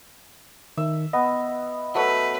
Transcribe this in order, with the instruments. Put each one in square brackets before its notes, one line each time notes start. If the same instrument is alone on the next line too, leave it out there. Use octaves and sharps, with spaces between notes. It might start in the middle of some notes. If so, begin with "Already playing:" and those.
[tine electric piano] D#3 [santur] E5
[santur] B3 [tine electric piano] D#5
[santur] F#3 A3 C#5 [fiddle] B4